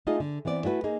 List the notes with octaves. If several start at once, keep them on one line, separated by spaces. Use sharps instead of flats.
A3 D#4 F4 G#4 D#5
D3
E3 B3 C4 D5
A3 E4 F#4 B4
A#3 D#4 G#4